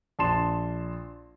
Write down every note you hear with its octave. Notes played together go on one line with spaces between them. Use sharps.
A#1 A5 C6 E7